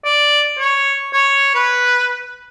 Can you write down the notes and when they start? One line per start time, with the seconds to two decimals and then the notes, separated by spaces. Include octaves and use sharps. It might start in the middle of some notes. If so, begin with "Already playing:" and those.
0.05 D5
0.59 C#5
1.13 C#5
1.55 B4